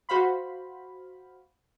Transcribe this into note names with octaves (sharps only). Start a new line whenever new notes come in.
F#4 C5 F5 B5